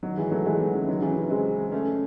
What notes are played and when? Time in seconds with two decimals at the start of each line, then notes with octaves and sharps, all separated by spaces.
0.03 D#3 F#3
0.17 E3 G#3
0.31 F#3 A3
0.46 E3 G#3
0.60 D#3 F#3
0.73 C#3 E3
0.88 D#3 F#3
1.01 C#3 E3
1.16 C#3
1.30 G#3 C4
1.72 A3 C#4